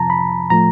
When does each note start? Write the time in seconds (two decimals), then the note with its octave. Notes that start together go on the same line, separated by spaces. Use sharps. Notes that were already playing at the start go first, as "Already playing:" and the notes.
Already playing: F2 C3 F3 A5 A#5
0.10 B5
0.50 A2 F3 A3 A#5